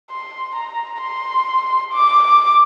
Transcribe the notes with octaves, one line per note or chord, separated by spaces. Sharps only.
C6
A#5
C6
D6
D6